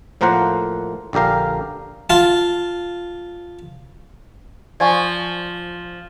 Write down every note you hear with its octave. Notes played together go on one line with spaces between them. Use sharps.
A2 F3 A#3 A#4 C5 F#5
A#1 D3 G4 A#4 F5
F4 A5
F3 D5 G#5 C#6